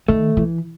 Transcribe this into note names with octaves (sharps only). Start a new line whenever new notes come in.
D#3 A3
E3